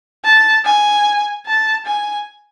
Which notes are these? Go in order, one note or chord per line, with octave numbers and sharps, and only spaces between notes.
A5
G#5
A5
G#5